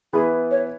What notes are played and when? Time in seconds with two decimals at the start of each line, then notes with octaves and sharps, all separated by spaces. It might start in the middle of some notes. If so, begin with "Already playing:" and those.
0.13 E3 B3 E4 G#4 B4
0.51 C#5